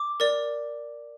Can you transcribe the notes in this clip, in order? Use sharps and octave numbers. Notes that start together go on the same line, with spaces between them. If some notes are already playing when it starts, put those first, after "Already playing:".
Already playing: D6
A#4 D5